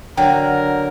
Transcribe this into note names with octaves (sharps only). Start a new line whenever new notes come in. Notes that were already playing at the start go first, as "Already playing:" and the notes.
D3 F#3 A#4 G5